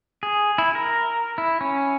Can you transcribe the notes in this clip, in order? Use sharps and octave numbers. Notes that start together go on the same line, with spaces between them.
G#4
E4
A#4
E4
C#4